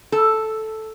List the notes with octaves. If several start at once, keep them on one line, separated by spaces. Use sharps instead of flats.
A4